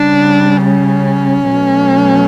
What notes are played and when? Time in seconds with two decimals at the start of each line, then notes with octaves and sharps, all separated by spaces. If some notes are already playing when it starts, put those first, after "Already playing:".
Already playing: C#3 G3 D4
0.63 C#4
1.47 B2 F#3 A3